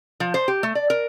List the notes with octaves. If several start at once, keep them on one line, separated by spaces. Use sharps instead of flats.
F3
C5
G4
A3
D5
A#4